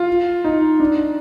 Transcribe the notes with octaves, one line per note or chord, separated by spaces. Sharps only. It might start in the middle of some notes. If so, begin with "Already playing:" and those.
Already playing: F4
D#4
D4